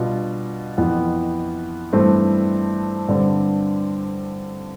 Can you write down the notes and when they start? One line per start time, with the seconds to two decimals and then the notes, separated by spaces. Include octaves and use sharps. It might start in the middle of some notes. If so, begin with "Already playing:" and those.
Already playing: B2 G3 D4 F4
0.78 F2 E3 B3
1.93 G2 E3 A3 C4
3.08 G2 D3 G3 C4